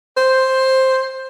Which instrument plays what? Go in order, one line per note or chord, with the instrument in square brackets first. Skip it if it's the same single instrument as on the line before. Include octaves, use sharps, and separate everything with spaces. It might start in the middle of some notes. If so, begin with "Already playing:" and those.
[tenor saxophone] C5